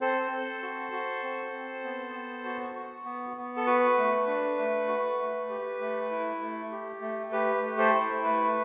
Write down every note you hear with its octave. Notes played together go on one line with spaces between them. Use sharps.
C4 A4 C5
C4
F#4
F#4
C4
C4
B3
B3
F#4
F#4
B3
B3
A4
F#4 B4
A3
D4
A3
F#4
A3
G4
A3
E4
A3
G4
A3
G4 B4
A3
A4 C5
E4
A3 B4